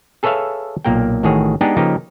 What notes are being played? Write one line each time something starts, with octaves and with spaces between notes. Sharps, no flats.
G#4 A4 B4 C#5 E5 F5
B1 A#2 A#3 A#4 G5
A1 A2 D#3 F#4 G#4 C#5
G#3 B3 D4 D#4 G4 G#4
C#3 F3 A#3 D#4 G4 B4